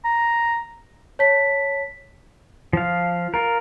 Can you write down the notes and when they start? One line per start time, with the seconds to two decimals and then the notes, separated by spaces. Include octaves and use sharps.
0.05 A#5
1.19 C#5 A5 B6
2.73 F3 F5
3.34 F4 A#4